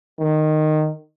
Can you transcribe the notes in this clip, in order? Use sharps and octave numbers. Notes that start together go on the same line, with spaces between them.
D#3